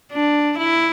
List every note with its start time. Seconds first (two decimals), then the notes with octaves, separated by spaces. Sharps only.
0.12 D4
0.58 E4